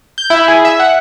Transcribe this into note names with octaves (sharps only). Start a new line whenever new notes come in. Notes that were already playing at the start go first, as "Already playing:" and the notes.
G6
E4
G#4
E5
F#5